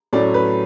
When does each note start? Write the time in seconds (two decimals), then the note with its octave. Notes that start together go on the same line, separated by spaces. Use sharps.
0.13 A2 F#3 A3 C#4 D5
0.34 B4